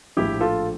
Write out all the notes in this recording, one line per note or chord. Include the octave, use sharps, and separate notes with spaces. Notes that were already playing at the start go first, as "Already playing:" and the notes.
A#1 A2 F3 E4 G4
F4 A4